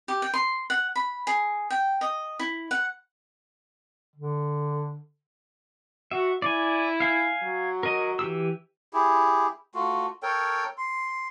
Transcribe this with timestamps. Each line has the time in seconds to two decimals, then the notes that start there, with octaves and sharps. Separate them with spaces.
0.08 G4
0.22 G5
0.34 C6
0.70 F#5
0.96 B5
1.27 G#4
1.70 G5
2.01 D#5
2.39 E4
2.71 F#5
4.16 D3
6.11 F#4 E5
6.42 E4 D5 G#5
7.00 F5 G#5
7.43 F#3
7.83 A#4 D#5
8.19 E3 G4 E6
8.93 E4 G4 G#4
9.75 A3 F4 F#4
10.23 A4 A#4 C#5 G5
10.78 C6